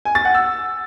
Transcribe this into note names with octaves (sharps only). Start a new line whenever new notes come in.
G#5
A6
F#5
E6